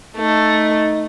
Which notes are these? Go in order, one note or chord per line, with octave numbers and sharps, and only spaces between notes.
A3 D#4